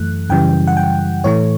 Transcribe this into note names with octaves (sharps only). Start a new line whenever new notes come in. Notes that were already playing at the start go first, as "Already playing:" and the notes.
Already playing: F#2 E3 A3 F#6
F#2 C#3 E3 G3 G5
F#5
G5
A2 E3 A3 C#5